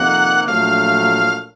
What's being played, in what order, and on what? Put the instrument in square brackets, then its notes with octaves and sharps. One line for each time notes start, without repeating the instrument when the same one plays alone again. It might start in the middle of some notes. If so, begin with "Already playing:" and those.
Already playing: [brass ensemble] F2 C3 D#3 A#3 [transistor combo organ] F#5
[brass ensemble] A#1 A#2 F#3 A3 [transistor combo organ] F5